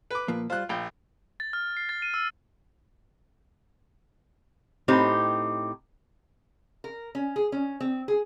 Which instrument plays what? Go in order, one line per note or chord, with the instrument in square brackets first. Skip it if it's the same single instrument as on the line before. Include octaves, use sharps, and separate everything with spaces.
[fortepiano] B4 D6
[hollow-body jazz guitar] A#2 F3 A#3
[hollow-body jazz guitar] G3 C5 [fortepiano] F4 F#6
[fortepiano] A#1 [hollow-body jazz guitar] F5 G5
[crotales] A6
F6
C7
A6
D#7
E6
[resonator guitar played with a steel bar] A2 C4 D#4 G4
A#4
C#4
G#4
C#4
C4
G#4